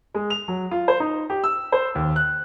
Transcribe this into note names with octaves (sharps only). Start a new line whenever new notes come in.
G#3
F7
F#3
F4
C5
D#4
G4
E6
C5
D#2
F#6